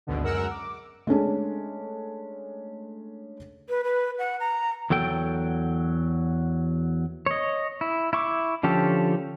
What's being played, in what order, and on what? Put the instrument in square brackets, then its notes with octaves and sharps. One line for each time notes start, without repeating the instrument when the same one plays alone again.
[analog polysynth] G#1 D2 B2 D3
F#2 G#3 A#4 F#5 E6
D6
[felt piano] G#3 A3 C#4 D4
[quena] B4
B4
F#5
A#5
[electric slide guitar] E2 F#3 A4 G5
[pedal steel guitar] C#5 D#5
E4
E4 C#6 D6
D3 F3 C#4 G4 A4